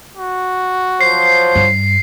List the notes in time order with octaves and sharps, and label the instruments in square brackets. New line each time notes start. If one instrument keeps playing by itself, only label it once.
[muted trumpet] F#4
[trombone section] F3 F#3 C5 [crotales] C7
[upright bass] G2